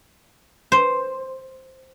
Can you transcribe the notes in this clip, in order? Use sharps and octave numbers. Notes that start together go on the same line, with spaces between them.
C5